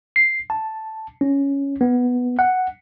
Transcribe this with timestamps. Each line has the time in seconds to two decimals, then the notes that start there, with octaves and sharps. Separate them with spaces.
0.16 C7
0.50 A5
1.21 C#4
1.81 B3
2.39 F#5